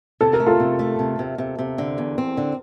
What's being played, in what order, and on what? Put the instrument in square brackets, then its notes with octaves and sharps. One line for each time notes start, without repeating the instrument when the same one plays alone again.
[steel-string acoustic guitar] C3 [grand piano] A4
[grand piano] A#4
[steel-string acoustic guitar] A3
[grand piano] F4 A4
[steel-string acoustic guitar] C3
A3
C3
C3
C3
C3
D3
E2
C4
D3